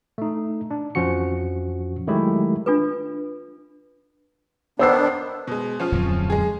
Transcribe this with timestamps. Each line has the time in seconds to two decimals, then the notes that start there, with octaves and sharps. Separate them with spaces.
0.18 A3 D#4
0.71 D4
0.95 F2 F3 C#4 F#4 C#7
2.07 D#3 F#3 G#3 A3 E4 G4
2.66 D4 F4 A4 B4
4.79 D#3 B3 D4 C5 E6 C7
5.47 B2 G#3
5.80 F3 C#4 F4
5.92 D1 F2 F#3
6.30 G#3 G#4